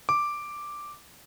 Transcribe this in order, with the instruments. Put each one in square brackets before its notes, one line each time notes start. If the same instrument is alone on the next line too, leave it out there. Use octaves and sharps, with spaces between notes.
[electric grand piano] D6